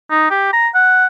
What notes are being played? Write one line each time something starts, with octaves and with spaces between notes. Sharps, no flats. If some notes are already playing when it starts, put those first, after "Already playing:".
D#4
G4
A#5
F#5